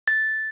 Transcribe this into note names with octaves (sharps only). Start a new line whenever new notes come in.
A6